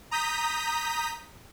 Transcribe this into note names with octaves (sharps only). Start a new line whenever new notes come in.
A#5 D#6 G6 B6